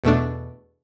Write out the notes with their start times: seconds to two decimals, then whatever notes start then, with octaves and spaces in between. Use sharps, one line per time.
0.04 E2 B2 A3 D4